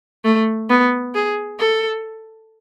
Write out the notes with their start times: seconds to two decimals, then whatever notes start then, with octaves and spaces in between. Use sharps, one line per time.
0.25 A3
0.70 B3
1.15 G#4
1.59 A4